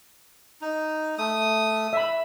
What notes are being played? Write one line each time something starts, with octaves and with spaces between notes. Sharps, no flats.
D#4
A3 D#6
E5 B5